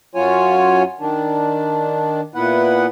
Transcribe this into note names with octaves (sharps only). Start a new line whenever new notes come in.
F#2 F#3 C#4 F4 C#5 G#5
D#3 D4
A#2 B3 E4 B4 F#5